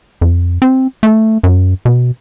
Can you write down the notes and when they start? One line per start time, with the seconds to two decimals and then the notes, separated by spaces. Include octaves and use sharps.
0.21 F2
0.62 C4
1.03 A3
1.43 F#2
1.85 B2